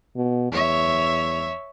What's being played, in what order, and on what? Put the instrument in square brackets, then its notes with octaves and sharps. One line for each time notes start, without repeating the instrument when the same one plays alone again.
[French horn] B2
[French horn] E2 [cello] C#5 E5